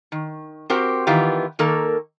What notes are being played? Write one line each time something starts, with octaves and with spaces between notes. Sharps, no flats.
D#3
C4 F#4 G4 A#4 C5
D#3 E3 B3 F4 G4
D#3 A#3 A4 A#4